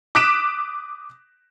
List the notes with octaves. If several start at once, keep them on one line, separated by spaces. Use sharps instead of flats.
D6 D#6 F#6 B6 D7 E7